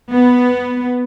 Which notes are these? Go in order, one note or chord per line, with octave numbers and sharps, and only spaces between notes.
B3